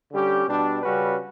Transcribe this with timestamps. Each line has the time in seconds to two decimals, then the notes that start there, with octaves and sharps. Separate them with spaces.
0.12 D3 G3 C#4 G4
0.48 B2 G3 D4
0.83 C#3 G3 C#4 F#4 B4